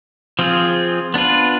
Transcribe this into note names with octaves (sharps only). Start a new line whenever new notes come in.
F3 C4 F4 G#4
B3 D4 F4 B4